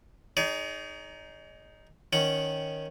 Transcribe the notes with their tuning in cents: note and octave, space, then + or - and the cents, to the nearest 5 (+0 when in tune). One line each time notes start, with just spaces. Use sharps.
D#4 +0 G#4 +0 C#5 +45
D#3 +0 C#4 +0 F#5 +0